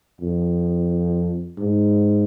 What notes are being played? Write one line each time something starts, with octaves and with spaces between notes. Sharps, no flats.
F2
G#2